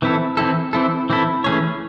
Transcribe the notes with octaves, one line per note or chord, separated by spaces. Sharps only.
E3 C4 E4 A4
E3 C4 E4 A4
E3 C4 E4 A4
E3 C4 E4 A4
E3 A3 C#4 G#4 C#5